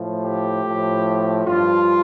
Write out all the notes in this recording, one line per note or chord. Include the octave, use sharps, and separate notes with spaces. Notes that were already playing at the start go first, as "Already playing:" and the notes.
Already playing: A2 F3
G4
A2 F3
G2 F3 F4